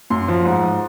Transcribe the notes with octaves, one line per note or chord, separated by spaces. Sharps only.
F#2 C6
F3
G#2
G#2